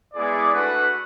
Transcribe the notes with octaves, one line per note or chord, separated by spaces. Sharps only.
G#3 B3 E4 G#4 D5
A3 D4 F#4 B4 F#5